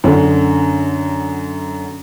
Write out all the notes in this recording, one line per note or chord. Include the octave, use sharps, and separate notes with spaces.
F#2 D3